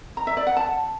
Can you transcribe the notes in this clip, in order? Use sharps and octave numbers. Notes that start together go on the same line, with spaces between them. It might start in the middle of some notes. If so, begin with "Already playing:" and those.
A#5
E5
D5
F#5
A5